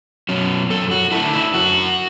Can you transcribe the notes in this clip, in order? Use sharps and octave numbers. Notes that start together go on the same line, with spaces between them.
B2 F#3 C#4
F#2 A4
F#4
D3 A3 D4 E4
E4
F#2 F#4